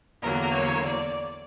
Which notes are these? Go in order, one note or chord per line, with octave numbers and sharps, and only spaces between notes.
E2 D3 F#3 A#3 A#4
C#5
D5